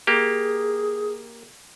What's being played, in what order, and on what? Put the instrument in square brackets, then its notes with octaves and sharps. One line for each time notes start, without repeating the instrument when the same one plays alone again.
[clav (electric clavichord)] A#3 G4 [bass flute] G#4